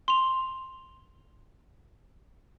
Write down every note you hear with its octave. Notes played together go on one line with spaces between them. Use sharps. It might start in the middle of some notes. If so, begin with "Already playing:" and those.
C6 F7